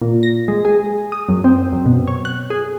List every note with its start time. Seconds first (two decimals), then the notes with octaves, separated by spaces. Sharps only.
0.02 A#2
0.23 A#6
0.48 G#3
0.65 G#4
1.12 D#6
1.29 F#2
1.44 C4
1.73 F#2
1.86 B2
2.07 C#5
2.25 F#6
2.50 G#4